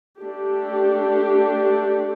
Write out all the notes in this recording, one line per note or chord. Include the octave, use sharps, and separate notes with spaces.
A3 D4 G4